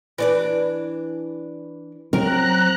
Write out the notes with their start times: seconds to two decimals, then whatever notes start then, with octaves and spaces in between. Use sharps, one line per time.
0.18 E3 D4 B4
2.13 F#3 C4 A#4 A#5 F#6